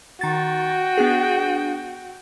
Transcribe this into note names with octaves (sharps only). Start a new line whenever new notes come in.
D#3 F#4 G5 A6
B3 D4 G#4